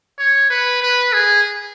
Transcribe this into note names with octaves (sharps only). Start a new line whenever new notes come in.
C#5
B4
B4
G#4